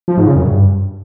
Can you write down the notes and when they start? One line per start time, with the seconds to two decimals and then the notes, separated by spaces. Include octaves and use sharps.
0.08 F3
0.17 G#2
0.27 C#3
0.36 F#2
0.46 G2